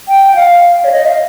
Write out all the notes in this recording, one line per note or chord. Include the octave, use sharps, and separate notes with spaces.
G5
G5
F5
C#5
D#5
F5